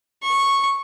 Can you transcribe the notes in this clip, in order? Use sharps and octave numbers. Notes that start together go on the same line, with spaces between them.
C#6